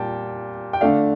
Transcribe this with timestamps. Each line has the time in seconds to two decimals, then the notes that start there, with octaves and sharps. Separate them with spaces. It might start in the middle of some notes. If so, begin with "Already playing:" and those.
Already playing: A#2 G3 G5 A5
0.73 G5
0.81 D3 A3 D4 F5